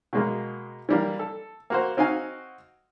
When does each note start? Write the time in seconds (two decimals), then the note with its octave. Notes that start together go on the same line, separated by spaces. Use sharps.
0.13 B2 G#3 A#3
0.89 E3 G3 A#3
1.19 A4
1.70 A#3 F#4 C5
1.97 C4 D#4 F#4 F5 G#5